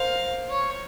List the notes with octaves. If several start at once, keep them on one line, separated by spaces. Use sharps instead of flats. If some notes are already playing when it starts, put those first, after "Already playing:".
Already playing: A#4 C5 F5
C#5